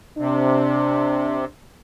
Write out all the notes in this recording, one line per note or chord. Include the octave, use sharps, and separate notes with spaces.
C3 D4